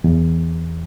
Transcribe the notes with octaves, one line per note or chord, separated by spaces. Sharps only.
E2